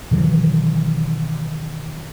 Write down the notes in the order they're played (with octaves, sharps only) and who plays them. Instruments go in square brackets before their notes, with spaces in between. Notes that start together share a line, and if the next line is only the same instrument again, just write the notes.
[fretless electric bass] B2 D#3 E3 F#3